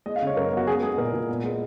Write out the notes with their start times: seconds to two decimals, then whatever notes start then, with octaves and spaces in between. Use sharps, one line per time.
0.06 G#3 D#5
0.16 F5
0.22 C#3
0.27 C#5
0.36 F#2 A#4
0.52 B3 F#4
0.67 B3 G#4
0.83 G#3 G#4
0.98 A#2 A#4
1.13 A#2
1.29 B3
1.44 G#3